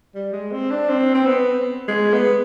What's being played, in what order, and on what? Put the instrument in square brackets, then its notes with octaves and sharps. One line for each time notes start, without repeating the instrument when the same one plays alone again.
[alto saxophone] G3
G#3
C4
D4
C4
C4
B3
G#3
B3